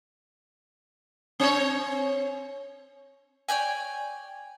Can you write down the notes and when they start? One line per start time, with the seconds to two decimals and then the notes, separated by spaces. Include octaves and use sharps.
1.40 C4 C#5
3.49 C#5 D5 G5 G#5